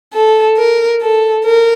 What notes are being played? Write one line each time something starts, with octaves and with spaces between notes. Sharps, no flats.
A4
A#4
A4
A#4